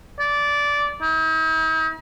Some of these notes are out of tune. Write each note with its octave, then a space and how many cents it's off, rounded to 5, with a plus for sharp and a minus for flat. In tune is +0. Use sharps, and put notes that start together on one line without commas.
D5 -15
D#4 +45